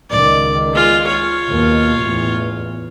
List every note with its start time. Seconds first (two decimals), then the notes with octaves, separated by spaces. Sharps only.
0.10 C#2 D#3 D5
0.73 G#3 F4
1.07 F4 C#5
1.50 D#2 B2
1.99 A1 E2